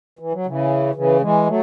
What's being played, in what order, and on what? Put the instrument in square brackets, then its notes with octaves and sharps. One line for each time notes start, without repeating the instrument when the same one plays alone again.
[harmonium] E3
F#3
C#3 E3
C#3 E3
E3 G#3
F#3 A3